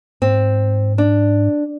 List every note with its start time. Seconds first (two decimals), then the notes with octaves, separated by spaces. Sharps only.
0.22 G#2 C4
0.98 D4